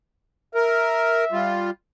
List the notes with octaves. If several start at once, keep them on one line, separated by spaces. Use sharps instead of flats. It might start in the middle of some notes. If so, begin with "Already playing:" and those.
A#4 E5
G3 F4